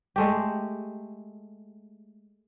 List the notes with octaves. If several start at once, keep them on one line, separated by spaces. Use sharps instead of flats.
G#3 A3 G4